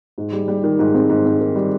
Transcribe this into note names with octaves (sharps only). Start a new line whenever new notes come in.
G#2
G3
G3
D#3
G#2
C4
G#2
C4
D#3
G3